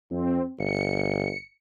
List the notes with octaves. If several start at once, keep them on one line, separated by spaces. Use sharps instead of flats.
F2 C4
G1 C#7